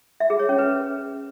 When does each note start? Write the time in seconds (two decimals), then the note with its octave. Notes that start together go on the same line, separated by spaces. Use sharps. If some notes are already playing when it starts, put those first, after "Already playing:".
0.20 E5
0.30 G#4
0.39 C#5
0.49 C#4
0.58 B4